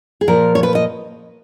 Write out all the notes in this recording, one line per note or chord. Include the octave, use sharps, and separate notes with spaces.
G#4
A#2 F3 A#4
C#5
B4
D#5